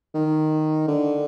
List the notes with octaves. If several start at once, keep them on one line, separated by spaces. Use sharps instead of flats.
D#3
D3